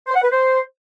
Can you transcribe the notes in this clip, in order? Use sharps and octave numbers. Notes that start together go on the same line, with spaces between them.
C5
F#5
B4
C5